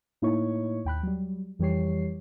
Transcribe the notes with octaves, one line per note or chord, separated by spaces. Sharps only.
A2 A#3 D#4 E4 C#5 C#6
D#2 G5 B5 F#6
F#3 G3
F2 E3 G3 G4 C#5 C7